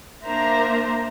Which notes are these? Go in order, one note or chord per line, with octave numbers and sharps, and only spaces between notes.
A#3 D4 A#4 C5 E5 A#5